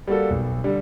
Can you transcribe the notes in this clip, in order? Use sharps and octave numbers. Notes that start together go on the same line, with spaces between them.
G3 A#3 F#4 A4
B1
D3 G3